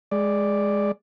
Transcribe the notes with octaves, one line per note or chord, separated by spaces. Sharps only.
G#3 D5